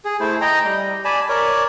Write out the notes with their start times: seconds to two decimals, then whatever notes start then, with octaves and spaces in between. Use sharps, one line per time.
0.05 G#4
0.20 A3 E4 C5
0.41 D#5 G5 A#5
0.65 G3
1.05 D5 G#5 A5 B5
1.29 A#4 C#5 D5